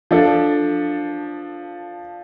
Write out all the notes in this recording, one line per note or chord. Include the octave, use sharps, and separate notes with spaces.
F3 D4 A4